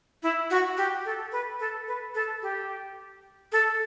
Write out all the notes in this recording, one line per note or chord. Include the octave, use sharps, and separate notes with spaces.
E4
F#4
G4
A4
B4
A4
B4
A4
G4
A4